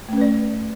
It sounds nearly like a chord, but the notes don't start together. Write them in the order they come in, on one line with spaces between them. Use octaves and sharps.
A3 C#4 B4 D5